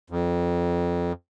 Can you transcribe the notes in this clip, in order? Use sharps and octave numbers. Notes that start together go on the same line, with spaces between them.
F2